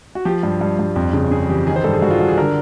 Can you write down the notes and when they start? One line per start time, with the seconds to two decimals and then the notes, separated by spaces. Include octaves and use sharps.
0.15 F#4
0.25 F3 G4
0.43 G2
0.61 G2
0.79 G2
0.96 F2
1.13 C#3
1.31 C#3 G#4
1.49 E3 G4
1.67 D#3 G#4
1.76 C5
1.84 G2 A4
1.93 G#4
2.02 G2 F#4
2.11 F4
2.19 G2 F#4
2.29 G#4
2.38 D3 A#4